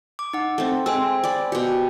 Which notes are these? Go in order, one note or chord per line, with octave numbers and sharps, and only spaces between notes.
D6
D#4 F#5
A3 C4
G#3 C4 C5 G#5 E6
D5 B5
B2 G4